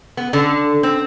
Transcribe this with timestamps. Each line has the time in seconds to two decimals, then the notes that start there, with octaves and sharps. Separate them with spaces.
0.17 B3
0.33 D3
0.83 C4